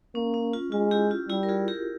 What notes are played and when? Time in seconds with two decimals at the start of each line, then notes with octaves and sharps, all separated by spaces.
0.15 A#3 C#4
0.34 C#4
0.53 F4
0.72 G#3 F4
0.91 E4 G4
1.11 F4
1.29 G3 E4 G4
1.43 A#4
1.49 F4 G#4
1.68 G4 A#4